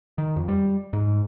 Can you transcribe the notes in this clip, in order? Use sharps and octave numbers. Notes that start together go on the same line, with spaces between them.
D#3
F2
G3
G#2